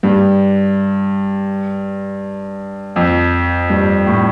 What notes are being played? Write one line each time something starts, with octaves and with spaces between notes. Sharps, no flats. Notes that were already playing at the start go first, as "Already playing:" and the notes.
G2
F2
G2
A2